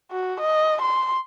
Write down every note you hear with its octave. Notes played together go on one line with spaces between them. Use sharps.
F#4
D#5
C6